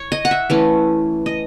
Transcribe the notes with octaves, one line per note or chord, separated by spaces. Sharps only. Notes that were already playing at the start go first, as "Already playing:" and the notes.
Already playing: C#5
D#5
F#5
E5
E3 A3 C#4
D#5